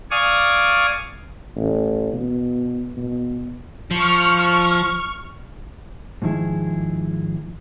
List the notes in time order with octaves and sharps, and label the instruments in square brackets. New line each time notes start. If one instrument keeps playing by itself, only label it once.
[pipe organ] D5 F5 G#5 C#6 D#6
[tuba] A1
B2
B2
[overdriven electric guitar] F3 [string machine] C#6 F6
[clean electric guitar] G#2 D#3 F3 E4 G#4